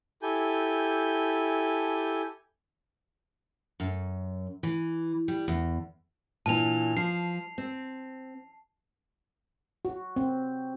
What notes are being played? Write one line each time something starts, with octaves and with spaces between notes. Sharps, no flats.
E4 G4 A4 G#5 G6
F#2
E3
G3
E2
A#2 E3 D4 A5 F7
F3 C7
C4
F#4
C4